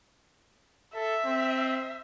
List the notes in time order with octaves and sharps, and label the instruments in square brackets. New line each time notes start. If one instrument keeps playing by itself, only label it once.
[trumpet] A4 [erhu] E5
[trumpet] C4